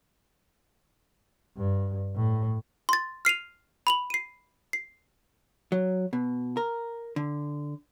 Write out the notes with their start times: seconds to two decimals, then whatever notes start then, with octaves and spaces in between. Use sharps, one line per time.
1.57 G2
2.16 A2
2.89 C6 A6
3.25 F6 C7 D#7 F7
3.87 B5 F7 F#7
4.10 C7 D#7
4.73 C7
5.72 F#3
6.13 B2
6.57 A#4
7.16 D3